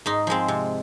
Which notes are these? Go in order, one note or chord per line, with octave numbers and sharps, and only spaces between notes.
G#2 D#4
F3 G#3 C4
C3